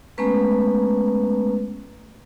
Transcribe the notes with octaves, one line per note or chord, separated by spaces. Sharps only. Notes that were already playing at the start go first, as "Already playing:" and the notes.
G#3 A3 B3 C#4 B4 A#5